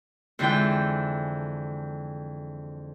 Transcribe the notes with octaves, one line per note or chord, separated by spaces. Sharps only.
F2 D3 E3 G#3 F4 G5